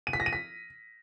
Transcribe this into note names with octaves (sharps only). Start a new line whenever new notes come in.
D#7
B6
A#6
D#7
B6